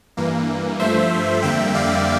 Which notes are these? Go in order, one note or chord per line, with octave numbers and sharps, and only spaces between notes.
G2 E3 A#3
G2 F3 A3 C5 E5
F2 D3 G3 A#3 E5 G5
D5 F5